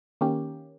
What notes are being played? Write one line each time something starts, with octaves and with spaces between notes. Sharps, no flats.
D#3 A#3 C#4 G4